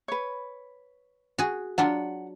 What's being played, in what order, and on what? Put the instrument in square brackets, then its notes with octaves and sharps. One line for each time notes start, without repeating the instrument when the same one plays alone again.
[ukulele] B4 C#5
[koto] F#4 G#4
[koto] F#3 D4 F4 [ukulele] F#5